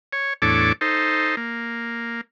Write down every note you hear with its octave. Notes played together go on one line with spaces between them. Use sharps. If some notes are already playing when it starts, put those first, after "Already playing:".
C#5
E2 A2 D4 A4 C#5 D6
D#4 A4 C5
A#3